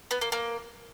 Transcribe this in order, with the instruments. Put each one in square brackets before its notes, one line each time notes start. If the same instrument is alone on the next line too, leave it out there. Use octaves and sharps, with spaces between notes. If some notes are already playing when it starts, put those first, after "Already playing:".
[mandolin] B3
A#3
A#3